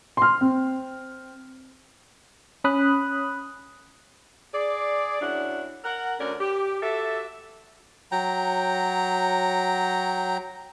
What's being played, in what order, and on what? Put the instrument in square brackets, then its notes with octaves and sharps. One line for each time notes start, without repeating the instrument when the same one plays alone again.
[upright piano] C6 F6
C4
[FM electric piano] C#4 B5 D#6 F#6
[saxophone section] G#4 D5
F#2 F#3 D4 E4 F#5
A#4 F#5
D2 D3 C#4 A#4 D5
G4
F#4 G4 A4 E5
[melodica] F#3 G5 A#5